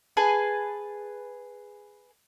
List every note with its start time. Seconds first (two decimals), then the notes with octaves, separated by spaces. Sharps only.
0.17 G#4 B4 G#5 A5